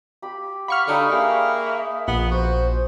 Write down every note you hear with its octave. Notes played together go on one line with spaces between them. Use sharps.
G4 B5
F5 F#5 B5 C#6 F6
D3 G3 D4 D#4 F5
A#3 G#4 E5
A#1 B3
F#4 C5